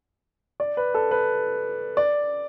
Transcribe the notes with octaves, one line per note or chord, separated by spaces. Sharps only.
D5
B4
A4
B4
D5